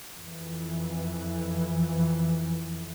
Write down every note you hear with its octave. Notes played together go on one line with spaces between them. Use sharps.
F2 E3